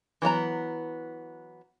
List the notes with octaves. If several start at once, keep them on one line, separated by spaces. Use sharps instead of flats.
E3 F#3 B3 A#5